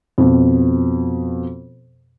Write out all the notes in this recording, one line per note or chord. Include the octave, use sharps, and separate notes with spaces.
F2 B2